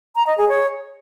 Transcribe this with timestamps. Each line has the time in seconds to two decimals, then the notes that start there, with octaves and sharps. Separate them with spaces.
0.16 A#5
0.27 D#5
0.38 G#4
0.49 C#5